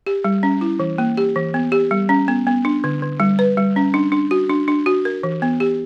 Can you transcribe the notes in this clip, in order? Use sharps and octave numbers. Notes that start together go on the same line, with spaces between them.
G4
G3
C#4
E4
E3
A#3
G4
E3
B3
G4
G3
C#4
B3
B3
D4
D3
D3
G3
B4
G3
C#4
D4
D4
F#4
D4
D4
F#4
A#4
E3
B3
G4